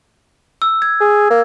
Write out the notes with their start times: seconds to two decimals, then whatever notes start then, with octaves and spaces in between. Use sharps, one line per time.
0.62 E6
0.82 G#6
1.01 G#4
1.30 A#3